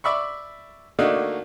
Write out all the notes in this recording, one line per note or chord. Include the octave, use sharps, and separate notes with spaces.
D5 E5 B5 C#6
D3 A3 A#3 D4 D#4 F#4